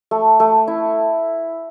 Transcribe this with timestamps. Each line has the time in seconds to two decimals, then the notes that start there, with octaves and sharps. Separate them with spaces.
0.11 A3
0.40 A3
0.68 E4